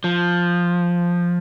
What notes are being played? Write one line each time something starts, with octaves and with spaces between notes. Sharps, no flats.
F3